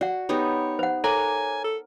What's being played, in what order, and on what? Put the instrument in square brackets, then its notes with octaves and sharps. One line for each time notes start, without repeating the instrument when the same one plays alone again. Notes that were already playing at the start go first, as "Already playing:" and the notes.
[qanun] F#4 [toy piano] D5 F#5
[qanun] B3 D#4 G4 [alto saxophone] C#5
[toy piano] C5 F#5
[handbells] A4 C#5 A#5 [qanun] A#4 [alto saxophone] G#5
[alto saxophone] A4